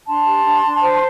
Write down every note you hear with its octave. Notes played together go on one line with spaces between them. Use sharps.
D4 A5 C6
G4
D4
D4
C5